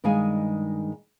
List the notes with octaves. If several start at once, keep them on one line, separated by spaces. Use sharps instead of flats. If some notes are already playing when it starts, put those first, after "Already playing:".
G2 D#3 G#3 F5 G#5